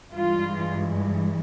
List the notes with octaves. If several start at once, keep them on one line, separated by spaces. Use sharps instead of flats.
G2 E3 G#3 F4